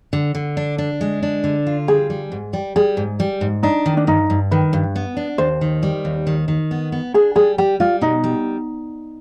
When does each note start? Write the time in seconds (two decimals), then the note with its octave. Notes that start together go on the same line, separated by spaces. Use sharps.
0.13 D3
0.35 D3
0.57 D4
0.78 D4
1.01 G#3
1.23 D4
1.44 D3
1.66 F4
1.88 G3 G#4
2.10 G3
2.32 G#2
2.53 G3
2.76 G3 G#4
2.97 G#2
3.20 G3
3.41 G#2
3.63 D4 D#4
3.86 D#3
3.97 D4
4.07 G2 D#4
4.30 G2
4.51 D#3 B4
4.73 G2
4.96 B3
5.17 D4
5.38 D#2 C5
5.61 D#3
5.83 G3
6.05 D#2
6.27 D#3
6.48 D#3
6.71 B3
6.92 B3
7.14 D4 G#4
7.36 G3 G#4
7.58 G3 G4
7.80 G3 F4
8.01 B2 D#4
8.24 G3